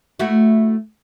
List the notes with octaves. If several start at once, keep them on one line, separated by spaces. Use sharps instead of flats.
A3 E4 F#4